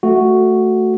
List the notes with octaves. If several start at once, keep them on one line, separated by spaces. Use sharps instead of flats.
A3 F#4